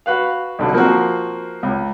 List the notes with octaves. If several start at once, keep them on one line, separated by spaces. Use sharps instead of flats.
F#4 B4 F5
B1 D3 F#3
F3 A#3 C4 F#4
C#2